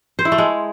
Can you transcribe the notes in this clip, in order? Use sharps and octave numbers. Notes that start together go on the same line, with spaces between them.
C5
E4
A3
G#3